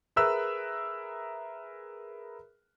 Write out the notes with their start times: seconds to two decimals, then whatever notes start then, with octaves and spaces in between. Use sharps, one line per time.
0.16 G#4 A#4 B4 E5 E6 F#6